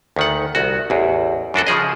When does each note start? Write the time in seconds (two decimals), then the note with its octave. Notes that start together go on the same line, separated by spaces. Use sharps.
0.16 D2 D#3 F#5
0.55 C2 F#4
0.90 A1 E2
1.54 F#2 D4 F#4 A4
1.67 C#3 F3 G#4 D#5